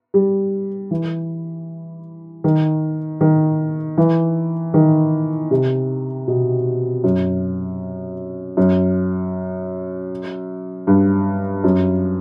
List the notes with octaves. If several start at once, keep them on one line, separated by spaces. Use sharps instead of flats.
G3
E3
D#3
D#3
E3
D#3
C3
B2
F#2
F#2
G2
F#2